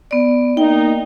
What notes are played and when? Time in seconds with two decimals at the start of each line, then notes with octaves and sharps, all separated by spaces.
0.11 B3 D5
0.57 A#3 D#4 G5